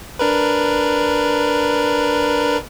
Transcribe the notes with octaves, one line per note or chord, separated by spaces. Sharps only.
D4 A#4 B4